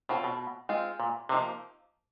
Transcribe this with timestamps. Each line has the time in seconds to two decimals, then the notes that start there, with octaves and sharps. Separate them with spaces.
0.09 B2 C4 F4 A4 C#5
0.24 B2
0.69 G#3 C4 F4
1.00 A#2
1.29 C3 F3 A#3 D#4